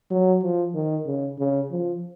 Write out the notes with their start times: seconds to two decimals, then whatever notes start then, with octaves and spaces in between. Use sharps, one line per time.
0.10 F#3
0.43 F3
0.75 D#3
1.06 C#3
1.38 C#3
1.71 F3